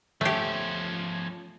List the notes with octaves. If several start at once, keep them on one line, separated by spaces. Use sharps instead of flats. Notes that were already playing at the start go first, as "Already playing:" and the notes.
F3 A3 C#4 G4